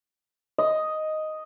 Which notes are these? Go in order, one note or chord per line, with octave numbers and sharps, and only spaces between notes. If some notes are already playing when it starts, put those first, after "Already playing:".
D#5